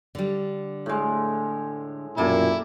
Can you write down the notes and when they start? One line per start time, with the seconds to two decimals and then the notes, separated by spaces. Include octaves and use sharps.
0.15 D3 G3
0.86 A2 G#3
2.17 B1 F#2 A#2 G3 A#3 E4 A4